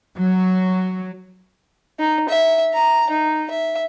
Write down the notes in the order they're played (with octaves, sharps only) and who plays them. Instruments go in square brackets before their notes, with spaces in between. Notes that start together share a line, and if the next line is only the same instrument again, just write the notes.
[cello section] F#3
[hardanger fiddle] D#4
E5
A#5
D#4
E5